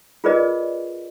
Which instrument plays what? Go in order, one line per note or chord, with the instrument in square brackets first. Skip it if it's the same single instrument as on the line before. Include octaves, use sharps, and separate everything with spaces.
[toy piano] F4 G#4 A#4 B4 D5 D#5